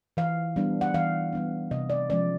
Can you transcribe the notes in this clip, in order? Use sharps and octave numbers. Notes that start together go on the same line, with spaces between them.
E3 F5
G3 B3 D4
F#5
E3 F5
G3 B3 D4
C3 D#5
D5
F3 G#3 C#4 D5